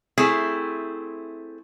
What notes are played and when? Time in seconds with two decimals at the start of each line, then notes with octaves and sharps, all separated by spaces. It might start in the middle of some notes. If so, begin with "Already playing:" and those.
0.18 A3 C4 E4 G#4